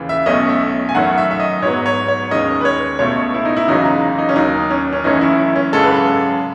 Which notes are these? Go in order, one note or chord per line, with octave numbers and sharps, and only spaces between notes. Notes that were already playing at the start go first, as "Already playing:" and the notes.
Already playing: D#2 C#3 E3
E5
B1 B2 A3 C#4 D#5
E5
G#5
F#2 D#3 A3 C#4 F#5
E5
E5
D#5
G#2 F#3 B3 C#5
C#5
C#5
D#2 D#3 G#3 C#4 D#5
B4
C#5
C#2 B2 A3 C#5
E4
D#4
E4
F#1 E2 C#3 F#3 D#4
D#4
D#4
C#4
D#2 D#3 F#3 D#4
C#4
C#4
F#1 F#2 E3 A3 C#4 D#4
E4
E4
C#4
G#1 F#2 C#3 G#3 C#4 A4
B4
A4